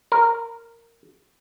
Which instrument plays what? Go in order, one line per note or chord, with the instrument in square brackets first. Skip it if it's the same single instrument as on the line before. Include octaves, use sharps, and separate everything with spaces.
[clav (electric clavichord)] A#4